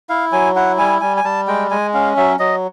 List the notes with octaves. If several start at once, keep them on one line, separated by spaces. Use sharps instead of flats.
E4 F5
F#3 G#5
E4 F#5
G3 G#5
G3 G#5
G#5
G3 A5
G#3 G5
G#3 G#5
C#4 F5
F#3 E5
F#3 D#5